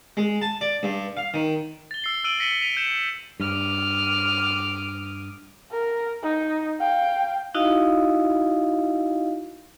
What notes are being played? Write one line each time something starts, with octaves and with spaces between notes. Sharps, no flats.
G#3
A5
D5
G2
F5
D#3
A6 G7
E6 C7 G7
E6 D7 D#7 F#7
A#6 B6 C#7 D#7 F#7 G7
B6 D#7 F7
G6 C#7 E7
G2 D6 D#6 F6
A#4
D#4
F5 G5
D#4 E4 F#4 D#5 F5